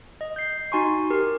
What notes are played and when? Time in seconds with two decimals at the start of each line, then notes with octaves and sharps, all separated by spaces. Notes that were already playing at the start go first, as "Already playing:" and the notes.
0.21 D#5
0.36 G6 C7
0.72 D#4 F#4 G#5 C6 C#6
1.10 G4 A#4